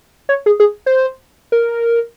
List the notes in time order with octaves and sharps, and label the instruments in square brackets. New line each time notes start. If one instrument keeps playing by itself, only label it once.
[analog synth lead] C#5
G#4
G#4
C5
A#4